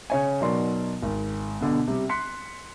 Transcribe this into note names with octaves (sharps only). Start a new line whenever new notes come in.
C#3 C#5 G#5
B2 F#3 D#4 A#4 D5 C6
G#1
B2 D3 B3
C3 G3
C6 F#6 B6 C#7